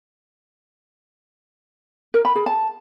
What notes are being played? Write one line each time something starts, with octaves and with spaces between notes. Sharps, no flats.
A#4
B5
G#4
A5